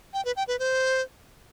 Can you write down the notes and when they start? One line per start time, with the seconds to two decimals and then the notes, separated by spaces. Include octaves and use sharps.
0.14 G5
0.25 B4
0.36 G5
0.48 B4
0.59 C5